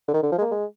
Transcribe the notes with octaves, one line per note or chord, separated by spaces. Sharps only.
D3
D#3
D3
F3
G#3
A#3
G#3